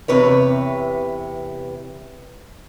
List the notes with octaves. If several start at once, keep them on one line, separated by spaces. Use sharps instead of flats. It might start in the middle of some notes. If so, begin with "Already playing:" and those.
E2 C3 B4 C#5